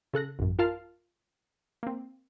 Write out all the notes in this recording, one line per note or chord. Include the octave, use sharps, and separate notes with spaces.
C#3 A4 F#6 A#6
A1 F#2
F4 A#4 F5 A5 F6
A#3 C4